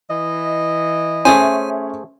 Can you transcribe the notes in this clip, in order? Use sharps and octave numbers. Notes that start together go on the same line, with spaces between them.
E3 D#5
A3 C#4 G#4 C5 E5 G#5